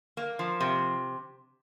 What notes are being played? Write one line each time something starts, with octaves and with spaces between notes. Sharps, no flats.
A#3
F3
C3